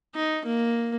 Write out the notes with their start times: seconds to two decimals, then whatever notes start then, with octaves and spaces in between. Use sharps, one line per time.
0.15 D#4
0.45 A#3